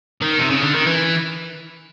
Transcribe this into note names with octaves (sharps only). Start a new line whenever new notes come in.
D#3
C3
C#3
D3
D#3
E3